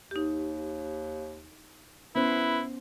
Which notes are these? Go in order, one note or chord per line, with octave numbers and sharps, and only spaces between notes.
D#2 D#4 G4
B3 C#4 E4 B4 C5